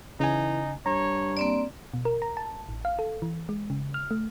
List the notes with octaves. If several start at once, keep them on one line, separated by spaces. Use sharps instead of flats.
C#3 E3 D#4 G#5
G2 C#5 A#5
A#3 C4 D5
B2
A#4
A#5
A5
A1
F5
A4
E3
G#3
C#3
F6
A3